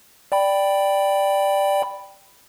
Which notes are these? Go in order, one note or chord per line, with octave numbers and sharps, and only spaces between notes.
D5 G5 B5